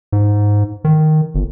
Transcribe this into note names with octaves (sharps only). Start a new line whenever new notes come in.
G#2
D#3
G1